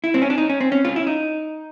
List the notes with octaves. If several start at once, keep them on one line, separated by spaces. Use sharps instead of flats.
E4
C4
C#4
D4
D#4
C#4
C4
C#4
F4
E4
D#4